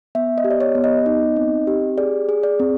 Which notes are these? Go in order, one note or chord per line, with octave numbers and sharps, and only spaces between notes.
B3 E5
D#5
G4
D5
C#5
B3
D#5
D#4
C4
G4
G#4 D5
G#4
D5
C4